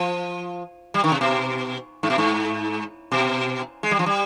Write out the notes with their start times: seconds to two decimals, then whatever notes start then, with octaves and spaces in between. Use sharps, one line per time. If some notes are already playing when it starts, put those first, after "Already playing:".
Already playing: F3
0.94 G3
1.04 D#3
1.12 C3
1.21 B2
2.03 G#2
2.10 B2
2.18 G#2
3.12 B2
3.83 G#3
3.91 G3
3.99 F3
4.06 G3